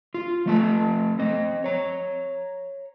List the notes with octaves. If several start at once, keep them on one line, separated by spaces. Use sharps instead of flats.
F4
F3 A3 A5
C4 D#5
C#5 A#5